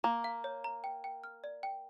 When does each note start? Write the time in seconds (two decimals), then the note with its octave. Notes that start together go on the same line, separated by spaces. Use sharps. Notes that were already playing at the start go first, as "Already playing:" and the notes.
0.04 A#3 A#5
0.24 F5
0.44 C#5
0.64 A#5
0.84 G5
1.04 G5
1.24 F6
1.44 D5
1.63 G5